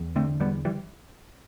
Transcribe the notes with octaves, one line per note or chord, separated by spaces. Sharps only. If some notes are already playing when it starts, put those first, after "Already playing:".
Already playing: E2
D3 A3 C4
E2 G3 B3
E3 G3